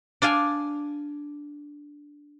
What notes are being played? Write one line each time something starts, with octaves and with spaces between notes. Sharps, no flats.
D4 D5 F5 G#5